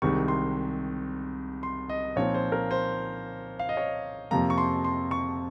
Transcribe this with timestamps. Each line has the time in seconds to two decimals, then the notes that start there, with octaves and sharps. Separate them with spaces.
0.02 C2 C3 D#3 G#3 C#6
0.28 C6
1.63 C6
1.90 D#5
2.16 A#2 F3 C4 D#4 C#5
2.34 C5
2.52 A#4
2.71 C5
3.59 F5
3.69 D#5
3.77 C#5
4.31 F2 C3 F3 A#3 A#5
4.50 C#6
4.58 C6
4.84 C6
5.11 C#6